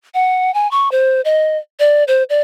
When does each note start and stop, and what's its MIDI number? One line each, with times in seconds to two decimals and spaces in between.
0.14 0.53 78
0.54 0.69 80
0.71 0.89 85
0.92 1.21 72
1.25 1.58 75
1.80 2.04 74
2.08 2.23 72
2.30 2.42 74